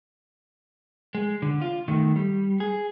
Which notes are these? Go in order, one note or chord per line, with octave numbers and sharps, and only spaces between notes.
G#3
D3
F4
D#3 A3
G3
G#4